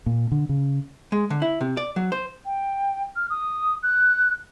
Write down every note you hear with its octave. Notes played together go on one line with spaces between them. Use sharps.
A#2
D3
C#3
G#3
D3
E4
C3
D5
F#3
C5
G5
F6
D#6
F#6